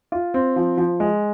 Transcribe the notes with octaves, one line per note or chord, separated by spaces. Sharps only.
F4
C4
F3
F3
G#3